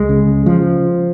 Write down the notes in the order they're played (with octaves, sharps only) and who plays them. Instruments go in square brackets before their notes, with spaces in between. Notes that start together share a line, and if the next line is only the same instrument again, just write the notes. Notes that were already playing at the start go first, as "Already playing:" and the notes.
Already playing: [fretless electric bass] C#2 G#3
C#3
F3